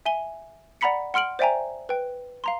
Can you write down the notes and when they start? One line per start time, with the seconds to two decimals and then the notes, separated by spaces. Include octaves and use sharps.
0.06 E5 G#5 D#7 G7
0.81 D5 F#5 A#5 B5 B6 C#7
1.14 F#5 C6 F6 D7 F#7
1.39 C5 D5 E5 G5 G#5 A#5
1.89 B4 G5
2.44 F5 A#5 C6